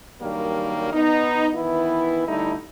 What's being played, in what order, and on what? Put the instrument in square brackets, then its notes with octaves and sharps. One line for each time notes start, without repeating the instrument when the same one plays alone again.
[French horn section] G2 D#3 F#3 G3 A#3
B3 D#4
D#3 E3 B3 E4
D3 G3 A3 D#4 E4